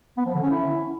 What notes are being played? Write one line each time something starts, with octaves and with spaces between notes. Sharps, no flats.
B3
F3
D3
C#4
E4